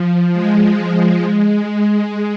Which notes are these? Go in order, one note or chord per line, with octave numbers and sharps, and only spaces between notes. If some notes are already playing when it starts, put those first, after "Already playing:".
Already playing: F3
G#3
G#3
G#3